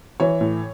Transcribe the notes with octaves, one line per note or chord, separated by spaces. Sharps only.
E3 C#5
A2